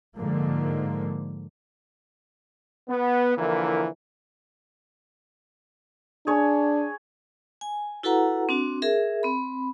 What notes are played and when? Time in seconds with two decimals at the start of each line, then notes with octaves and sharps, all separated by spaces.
0.15 G#2 D3 F3 A#3
2.89 B3
3.37 D3 E3 F3 A#3 E4 A#4
6.27 D4 G#4 C#5
7.61 G#5
8.03 E4 F#4 A4 B4 F#5 A#5
8.49 C4 D4 F#4
8.82 G#4 A#4 E5
9.23 C4 B5